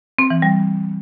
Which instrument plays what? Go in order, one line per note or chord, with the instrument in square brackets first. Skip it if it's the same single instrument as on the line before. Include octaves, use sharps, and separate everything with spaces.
[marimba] C4
E3
G3